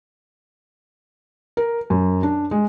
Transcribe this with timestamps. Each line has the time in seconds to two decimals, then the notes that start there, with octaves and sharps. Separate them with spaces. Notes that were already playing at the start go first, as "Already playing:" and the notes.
1.57 A#4
1.90 F#2
2.23 D4
2.51 G#3